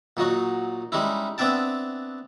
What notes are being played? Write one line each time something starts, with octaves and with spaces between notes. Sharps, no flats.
A#2 F#3 D#4 F#4
G3 G#3 C#4 D#4 E4
B3 C4 D4 E5 G5 A5